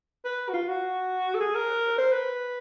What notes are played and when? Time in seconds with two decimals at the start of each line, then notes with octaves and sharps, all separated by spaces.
0.25 B4
0.49 F#4
0.54 F4
0.69 F#4
1.35 A4
1.40 G#4
1.55 A#4
1.98 C5
2.12 B4